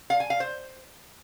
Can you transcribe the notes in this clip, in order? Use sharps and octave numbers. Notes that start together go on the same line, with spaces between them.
F5
G#5
F5
C5